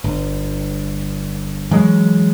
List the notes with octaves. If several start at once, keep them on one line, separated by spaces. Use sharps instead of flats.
G1
E3 F#3 G#3